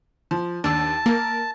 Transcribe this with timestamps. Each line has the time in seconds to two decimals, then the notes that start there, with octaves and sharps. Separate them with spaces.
0.31 F3
0.64 D#2 D4 A5 E6
1.06 A#3 A#4